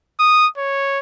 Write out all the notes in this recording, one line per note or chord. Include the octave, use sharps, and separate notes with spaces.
D#6
C#5